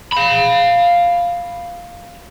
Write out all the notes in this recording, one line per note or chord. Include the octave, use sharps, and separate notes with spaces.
F5 B5